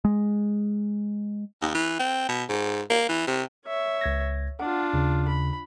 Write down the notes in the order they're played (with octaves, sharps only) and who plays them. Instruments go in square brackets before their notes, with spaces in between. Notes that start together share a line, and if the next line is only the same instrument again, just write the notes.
[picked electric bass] G#3
[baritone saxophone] D#2
E3
C4
B2
G#2
A#3
E3
C3
[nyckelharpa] C#5 E5
[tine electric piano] C#2 G#6 A#6
[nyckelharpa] D4 F4 [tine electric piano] F#5
[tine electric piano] D#2 C#3
[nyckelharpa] B5